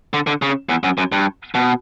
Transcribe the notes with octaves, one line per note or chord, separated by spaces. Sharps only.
D3
D3
C#3
E2
F#2
F#2
G2
B2